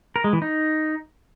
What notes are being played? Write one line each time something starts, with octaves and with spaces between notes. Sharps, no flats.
A#4
G#3
E3
D#4